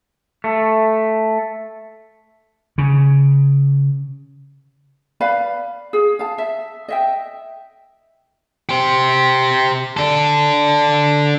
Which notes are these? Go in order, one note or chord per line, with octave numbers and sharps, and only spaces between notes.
A3
C#3
B4 D5 F5 B5
G#4
F5 A5
E5
D#5 E5 G5
G4 C5
D4 A4